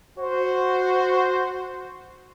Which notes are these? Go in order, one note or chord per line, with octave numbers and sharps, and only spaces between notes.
F#4 C5